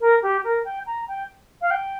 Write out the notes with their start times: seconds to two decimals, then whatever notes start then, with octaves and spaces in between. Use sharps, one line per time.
0.01 A#4
0.23 G4
0.44 A#4
0.65 G5
0.87 A#5
1.08 G5
1.62 F5
1.71 G5